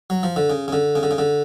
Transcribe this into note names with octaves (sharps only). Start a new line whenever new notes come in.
F#3
F3
D3
C#3
C#3
D3
C#3
D3
C#3
D3